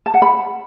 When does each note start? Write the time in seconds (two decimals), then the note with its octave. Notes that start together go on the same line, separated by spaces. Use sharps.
0.06 A5
0.14 F#5
0.22 B5